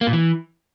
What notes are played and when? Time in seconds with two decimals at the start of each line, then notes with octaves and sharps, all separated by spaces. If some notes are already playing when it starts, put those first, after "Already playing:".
0.01 A#3
0.07 A#2
0.13 E3